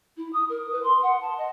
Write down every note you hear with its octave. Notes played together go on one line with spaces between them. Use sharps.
E4
D#6
A#4
B4
C6
F#5
A5
D#5